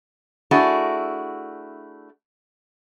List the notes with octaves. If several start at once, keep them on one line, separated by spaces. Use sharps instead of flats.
A3 D4 E4 F#4 G#4